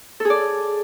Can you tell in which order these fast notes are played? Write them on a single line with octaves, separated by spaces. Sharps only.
A4 G#4 D5